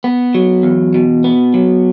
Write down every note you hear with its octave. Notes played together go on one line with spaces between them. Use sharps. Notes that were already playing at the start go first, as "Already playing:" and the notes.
B3
F#3
E2
B2
B3
F#3